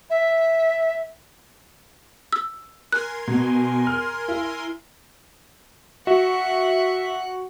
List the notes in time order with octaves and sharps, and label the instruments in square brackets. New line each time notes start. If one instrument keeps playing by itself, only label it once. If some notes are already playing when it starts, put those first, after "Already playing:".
[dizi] E5
[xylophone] E6
[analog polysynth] A#4 G#5 C6 [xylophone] F#6
[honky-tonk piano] B2
F6
E4
[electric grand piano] F#4 [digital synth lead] E5 [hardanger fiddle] F#5